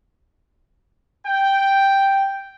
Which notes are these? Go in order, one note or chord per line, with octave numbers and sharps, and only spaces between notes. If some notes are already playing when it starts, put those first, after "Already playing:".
G5